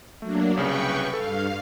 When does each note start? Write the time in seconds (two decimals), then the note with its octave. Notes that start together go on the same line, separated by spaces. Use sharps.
0.22 F#3 A3 A#3 D4
0.57 C2 C#3 B4 G5 C#6
1.14 G2 A4 F5